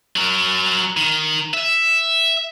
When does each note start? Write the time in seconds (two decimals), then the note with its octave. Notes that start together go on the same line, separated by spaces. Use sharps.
0.16 F#3 A#4
0.97 D#3
1.54 E5